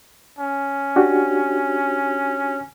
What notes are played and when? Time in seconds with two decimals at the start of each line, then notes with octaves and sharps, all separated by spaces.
0.39 C#4
0.96 D4 F#4 G4